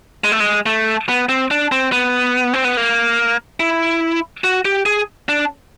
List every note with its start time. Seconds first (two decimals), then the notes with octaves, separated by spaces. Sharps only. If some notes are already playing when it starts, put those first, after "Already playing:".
0.24 G#3
0.32 A3
0.40 G#3
0.66 A3
1.09 B3
1.29 C4
1.51 D4
1.72 C4
1.92 B3
2.54 C4
2.64 B3
2.77 A#3
3.60 E4
4.44 F#4
4.65 G4
4.86 G#4
5.29 D4